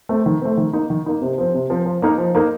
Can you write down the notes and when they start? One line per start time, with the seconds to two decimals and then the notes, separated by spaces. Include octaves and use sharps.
0.09 A3 C4
0.26 D#3
0.42 A3 C4
0.57 D#3
0.73 A#3 D#4
0.90 D#3
1.06 A#3 D#4
1.22 C3
1.38 F3 C4
1.54 C3
1.70 F3 C4
1.86 F3
2.02 A#3 D#4 A#4
2.18 F3
2.35 A#3 D#4 A#4